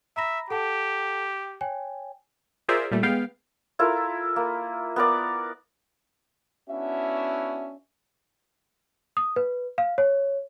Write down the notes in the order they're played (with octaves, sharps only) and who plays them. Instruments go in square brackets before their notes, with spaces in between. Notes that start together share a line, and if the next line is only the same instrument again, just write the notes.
[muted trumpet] E5 [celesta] A#5 B5 A#6
[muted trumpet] G4 [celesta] A4 F#5 A5
[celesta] C#5 G5 G#5
[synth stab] F4 G#4 A#4 C5 D5 E5
A#2 G3 A3
G#3 B3 F5 G5
[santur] E4 F4 A4 A#4
A#3
B3 A#4 D5
[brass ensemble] B3 C#4 D4 E4 F#4 E5
[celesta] D#6
B4
F5
C#5